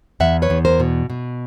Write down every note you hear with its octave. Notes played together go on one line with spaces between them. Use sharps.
E2 E5 F#5
B4 C#5
E2
A#4 C5
B2
B2